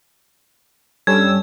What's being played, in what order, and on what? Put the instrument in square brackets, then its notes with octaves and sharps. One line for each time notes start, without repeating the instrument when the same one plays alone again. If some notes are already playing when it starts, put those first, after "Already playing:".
[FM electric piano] G2 C#4 A4 [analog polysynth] G3 E6 [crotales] G#6